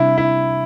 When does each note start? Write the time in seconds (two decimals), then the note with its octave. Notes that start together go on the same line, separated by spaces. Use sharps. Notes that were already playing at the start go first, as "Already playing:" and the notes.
Already playing: C3 G3 D4 E4
0.18 E4